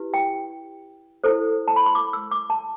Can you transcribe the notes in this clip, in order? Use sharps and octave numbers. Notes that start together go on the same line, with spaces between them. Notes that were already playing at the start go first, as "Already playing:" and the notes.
Already playing: E4 G4 B4
G5
E4 A4 C5
A5
B5
C6
D6
E6
D6
A5